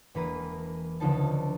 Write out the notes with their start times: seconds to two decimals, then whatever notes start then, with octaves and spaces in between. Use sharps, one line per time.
0.15 E1 E3 A#3 B4 A#5 D#7
1.00 C#2 D3 F3 C4 D#4 A5